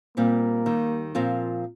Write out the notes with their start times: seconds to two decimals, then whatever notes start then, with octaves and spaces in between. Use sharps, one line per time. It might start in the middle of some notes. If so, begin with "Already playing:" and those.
0.17 A#2 G3 A#3 C4 G4
0.66 D#2 D#3 G3
1.15 A#2 F3 C4 F4 A#4